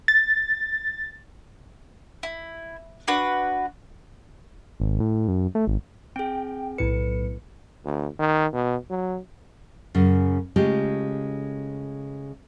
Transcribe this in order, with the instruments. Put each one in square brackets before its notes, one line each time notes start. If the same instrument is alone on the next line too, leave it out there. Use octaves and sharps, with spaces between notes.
[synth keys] A6
[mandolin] E4
D4 F#4 B4
[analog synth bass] G#1
A2
F#2
A3
G#1
[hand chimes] C4 G#4 [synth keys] G5
[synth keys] B1 A2 C#7 [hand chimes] B4
[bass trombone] D2
D#3
B2
F#3
[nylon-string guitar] F#2 C#3
C#3 G#3 A3 F4 G4